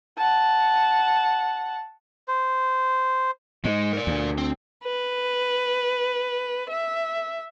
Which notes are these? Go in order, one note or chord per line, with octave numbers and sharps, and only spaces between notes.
F#5 A5
C5
G#2 G#3
A#4 D5
D2
C4
B4
E5